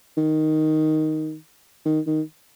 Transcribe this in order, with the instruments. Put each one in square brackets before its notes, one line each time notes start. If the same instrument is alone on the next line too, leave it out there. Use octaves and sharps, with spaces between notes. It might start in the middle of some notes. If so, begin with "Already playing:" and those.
[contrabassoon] D#3
D#3
D#3